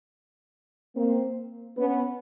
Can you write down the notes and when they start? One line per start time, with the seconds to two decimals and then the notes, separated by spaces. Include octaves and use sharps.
0.94 A#3 C4
1.77 B3 C#4